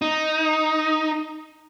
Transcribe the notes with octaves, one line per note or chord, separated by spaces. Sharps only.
D#4